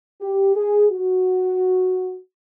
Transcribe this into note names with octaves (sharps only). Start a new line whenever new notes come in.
G4
G#4
F#4